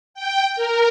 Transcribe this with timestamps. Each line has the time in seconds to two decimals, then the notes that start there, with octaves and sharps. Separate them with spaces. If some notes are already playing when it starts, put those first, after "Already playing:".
0.14 G5
0.56 A#4